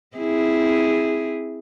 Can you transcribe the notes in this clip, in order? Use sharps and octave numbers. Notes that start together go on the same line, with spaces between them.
C4 E4 G#4